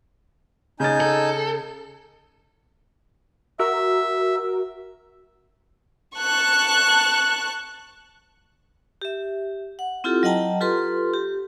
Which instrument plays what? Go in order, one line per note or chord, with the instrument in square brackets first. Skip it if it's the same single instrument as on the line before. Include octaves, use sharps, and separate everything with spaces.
[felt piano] C#3 A6 [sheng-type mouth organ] D#4 G#5 G6
[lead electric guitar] A4
[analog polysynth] F#4 A#4 [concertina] E5
[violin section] A5 C#6 F#6
[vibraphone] G4 E5
F#5
C4 E4 F4 G4 A4
F#3 D#5 F#5 G5 A5 A#5
F4 G4 A4 B4 C6
G4